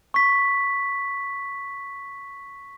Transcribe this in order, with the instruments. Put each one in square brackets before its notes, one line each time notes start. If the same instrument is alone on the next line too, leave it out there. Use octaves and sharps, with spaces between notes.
[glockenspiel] C#6 B6